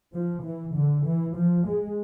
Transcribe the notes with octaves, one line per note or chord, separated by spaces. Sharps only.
F3
E3
D3
E3
F3
G#3